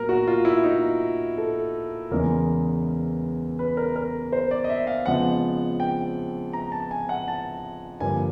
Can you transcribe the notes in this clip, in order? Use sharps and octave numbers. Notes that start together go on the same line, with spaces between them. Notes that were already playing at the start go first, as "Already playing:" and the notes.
Already playing: A#2 F#3 B3 A#4
F#4
F4
E4
D#4
A4
E2 C#3 E3 G#3 A#4
B4
A#4
A#4
C5
D5
D#5
E5
F5
F2 C#3 F3 G#3 B3 F#5
G5
A#5
A5
G#5
F#5
A5
G2 D3 F3 A#3 G#5